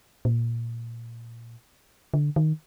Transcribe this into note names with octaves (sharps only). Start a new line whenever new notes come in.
A#2
D3
D#3